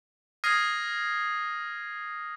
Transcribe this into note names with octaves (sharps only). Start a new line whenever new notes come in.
D#6 F6 G#6 A#6 C7 D#7